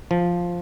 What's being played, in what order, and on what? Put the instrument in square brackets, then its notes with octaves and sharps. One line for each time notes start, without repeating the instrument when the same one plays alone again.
[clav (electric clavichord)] F3